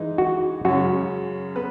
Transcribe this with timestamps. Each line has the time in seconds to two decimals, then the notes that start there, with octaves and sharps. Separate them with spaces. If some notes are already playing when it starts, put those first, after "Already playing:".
Already playing: E3 G#3 D#4
0.18 F#4
0.65 F#2 C#3 G#3 C#4 F#4
1.56 B3 B4